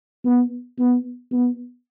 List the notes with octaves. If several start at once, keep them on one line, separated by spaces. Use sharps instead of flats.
B3
B3
B3